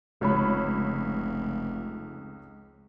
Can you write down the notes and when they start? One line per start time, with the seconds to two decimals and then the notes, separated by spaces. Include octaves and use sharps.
0.21 F1 C#2 C#5 B5